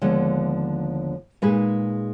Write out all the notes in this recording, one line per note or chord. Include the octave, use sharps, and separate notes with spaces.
D#2 D3 F3 G#3 B3
A#2 G#3 D#4 G#4 B4